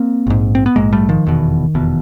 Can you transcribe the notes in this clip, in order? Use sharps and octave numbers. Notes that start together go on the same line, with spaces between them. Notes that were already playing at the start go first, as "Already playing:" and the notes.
Already playing: A#3 C4
A#1 G#2
C4
B3
A#1 G#2 G#3 A#3
G3 A3
D#3 F3
F1 E2 B2
F1 E2 B2